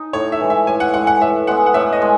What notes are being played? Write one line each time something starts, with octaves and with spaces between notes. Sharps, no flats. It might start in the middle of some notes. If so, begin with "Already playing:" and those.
Already playing: D#4
A2 C#5
E5
E3 G#3
E5
A2 G#5
F#5
E3 G#3 F#5
F#5
A2 E5
G#3 B3 F#5
F#5
A2 E5
D#5
G#3